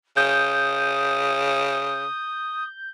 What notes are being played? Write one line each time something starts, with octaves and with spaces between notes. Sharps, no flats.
C#3 D#6 G6